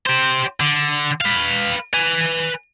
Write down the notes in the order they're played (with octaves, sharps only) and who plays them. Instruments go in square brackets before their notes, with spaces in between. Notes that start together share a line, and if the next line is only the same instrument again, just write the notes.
[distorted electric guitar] G4 C5
D3
B4 F5
B4 G#5